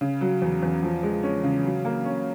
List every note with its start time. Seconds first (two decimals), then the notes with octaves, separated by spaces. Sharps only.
0.01 C#3
0.21 F#3
0.42 E2
0.62 E2
0.83 F3
1.03 G#3
1.23 C#4
1.44 C#3
1.64 F#3
1.85 A#3
2.05 C#4